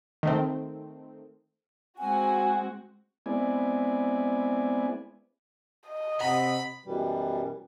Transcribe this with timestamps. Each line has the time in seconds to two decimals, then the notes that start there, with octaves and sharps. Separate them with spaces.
0.23 D#3 A3 C4
1.99 G#3 C4 F#4 G#5
3.26 G#3 B3 C4 E4 D5 G#5
5.89 D#5
6.21 C3 F#5 B5
6.85 F#2 B2 E3 G3